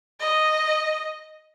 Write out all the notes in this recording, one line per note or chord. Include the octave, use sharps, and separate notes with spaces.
D#5